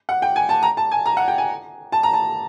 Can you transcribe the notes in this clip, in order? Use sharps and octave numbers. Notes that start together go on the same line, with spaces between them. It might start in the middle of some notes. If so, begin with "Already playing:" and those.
F#5
G5
G#5
A5
A#5
A5
G#5
A#5
F#5
G5
G#5
A5
A#5
A5